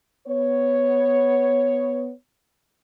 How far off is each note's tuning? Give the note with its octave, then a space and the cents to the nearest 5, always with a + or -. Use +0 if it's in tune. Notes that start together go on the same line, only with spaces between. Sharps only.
B3 +5 C#5 +0